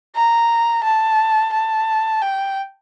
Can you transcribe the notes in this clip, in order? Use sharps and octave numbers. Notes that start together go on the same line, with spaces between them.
A#5
A5
A5
G5